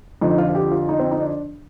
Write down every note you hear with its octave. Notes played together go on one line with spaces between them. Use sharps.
F2 D3 F3 D#4
F4
F4
G4
F4
D#4
C4
D#4
D4